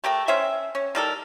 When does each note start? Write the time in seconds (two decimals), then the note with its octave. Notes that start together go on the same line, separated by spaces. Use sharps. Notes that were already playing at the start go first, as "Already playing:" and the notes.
0.04 A3 G4 A#4 G5
0.27 C#4 C5 E5 G5
0.75 C#4
0.95 D#3 G3 A4 A#4